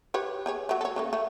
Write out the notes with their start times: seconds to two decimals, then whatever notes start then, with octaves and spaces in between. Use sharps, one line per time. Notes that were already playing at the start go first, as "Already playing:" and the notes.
0.14 G4 B4 C#5
0.46 G4 G#4 C#5
0.69 F#3 A3
0.81 A4 C#5
0.96 C#3 A3 A#3
1.13 A3